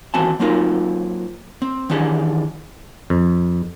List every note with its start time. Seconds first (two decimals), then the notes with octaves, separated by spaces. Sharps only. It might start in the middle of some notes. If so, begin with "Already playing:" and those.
0.14 D#2 E3 C4 F#4 G#5 A5
0.40 F#3 A#3 C4 D#4 F4 A#4
1.62 C4
1.90 D#3 E3 D4 G4 G#4
3.10 F2